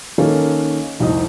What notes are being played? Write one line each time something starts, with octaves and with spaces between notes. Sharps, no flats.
D#3 A#3 C#4 A4
F1 C2 D#4 D#5